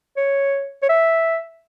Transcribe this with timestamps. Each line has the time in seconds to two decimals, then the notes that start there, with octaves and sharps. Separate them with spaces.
0.17 C#5
0.82 C#5
0.89 E5